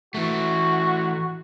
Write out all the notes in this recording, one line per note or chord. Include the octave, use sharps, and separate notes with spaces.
E3 A3 F#4